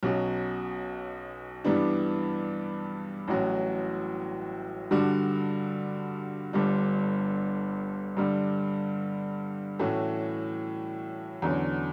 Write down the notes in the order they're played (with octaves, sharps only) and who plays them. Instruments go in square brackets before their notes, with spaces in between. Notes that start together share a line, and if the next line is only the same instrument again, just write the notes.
[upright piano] B1 B2 F#3 C#4 F#4
G2 E3 G3 B3 D4
A1 A2 F#3 C#4 F#4
G2 D3 G3 D4 F#4
G1 G2 D3 G3 D4
G2 D3 G3
A2 E3 A3 C#4 F#4
E2 D3 F#3 C#4